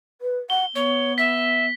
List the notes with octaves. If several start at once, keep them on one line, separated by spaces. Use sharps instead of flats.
B4
F#5 G7
B3 C#5
E5 B6